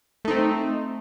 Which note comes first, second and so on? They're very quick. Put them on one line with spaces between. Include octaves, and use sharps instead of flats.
A3 D#4 C4